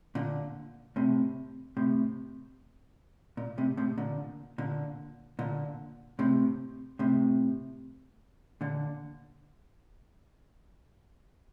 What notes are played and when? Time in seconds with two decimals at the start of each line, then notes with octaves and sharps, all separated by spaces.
0.15 A#2 D3
0.96 A2 C3
1.77 A2 C3
3.37 A#2
3.58 A2 C3
3.77 A2 C3
3.98 A#2 D3
4.58 A#2 D3
5.39 A#2 D3
6.19 A2 C3
6.99 A2 C3
8.61 A#2 D3